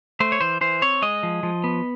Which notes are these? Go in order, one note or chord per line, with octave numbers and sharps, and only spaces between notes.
A3 C5
C#5
E3 C5
E3 C5
C4 C#5
G#3 D#5
F3
F3
B3